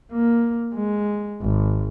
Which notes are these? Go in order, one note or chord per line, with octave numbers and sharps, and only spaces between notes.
A#3
G#3
G#1